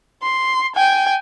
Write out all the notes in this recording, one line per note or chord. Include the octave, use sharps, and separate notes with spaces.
C6
G5 G#5